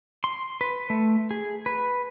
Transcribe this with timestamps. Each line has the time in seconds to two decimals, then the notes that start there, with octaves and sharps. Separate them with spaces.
0.24 C6
0.61 B4
0.90 A3
1.31 G#4
1.66 B4